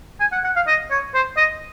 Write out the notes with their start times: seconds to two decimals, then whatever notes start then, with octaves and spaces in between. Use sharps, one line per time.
0.20 G#5
0.32 F#5
0.44 F#5
0.56 F5
0.67 D#5
0.91 C#5
1.14 C5
1.37 D#5